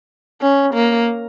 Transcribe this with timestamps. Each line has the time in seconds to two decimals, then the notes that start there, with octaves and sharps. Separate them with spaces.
0.41 C#4
0.74 A#3